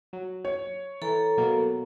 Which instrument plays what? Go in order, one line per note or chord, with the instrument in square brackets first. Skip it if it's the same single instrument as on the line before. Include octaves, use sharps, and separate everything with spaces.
[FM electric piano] F#3
[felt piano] C#5
[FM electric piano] E3 [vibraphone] A4 A#5
[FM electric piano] B2 F#3 A#3